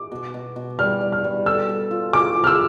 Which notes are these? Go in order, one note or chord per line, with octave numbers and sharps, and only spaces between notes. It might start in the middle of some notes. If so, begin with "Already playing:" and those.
Already playing: D6
B2
B2
B2
G3 F6
G3
F6
G3
A4 E6
A4
F4
F3 D6
F3
F6
E6